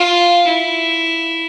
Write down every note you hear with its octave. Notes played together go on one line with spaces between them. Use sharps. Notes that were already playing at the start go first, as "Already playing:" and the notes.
Already playing: F4
E4